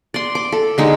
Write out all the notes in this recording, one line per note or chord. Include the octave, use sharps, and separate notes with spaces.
D5 C6
D6
A4
D3 G#3 D#4